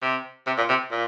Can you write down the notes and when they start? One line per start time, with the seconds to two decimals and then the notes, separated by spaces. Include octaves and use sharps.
0.02 C3
0.47 C3
0.57 A#2
0.69 C3
0.91 A#2